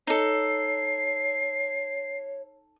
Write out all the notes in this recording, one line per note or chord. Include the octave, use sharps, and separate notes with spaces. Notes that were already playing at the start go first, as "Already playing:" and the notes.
D#4 A4 C#5 C7